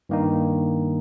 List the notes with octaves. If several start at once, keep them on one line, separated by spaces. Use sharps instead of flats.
G2 D#3 A#3 D#4